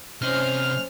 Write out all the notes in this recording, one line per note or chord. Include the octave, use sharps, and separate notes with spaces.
C3 C#4 C5 D#5 F6